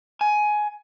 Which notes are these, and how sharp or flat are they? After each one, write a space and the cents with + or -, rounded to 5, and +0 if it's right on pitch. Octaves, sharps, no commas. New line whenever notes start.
G#5 +15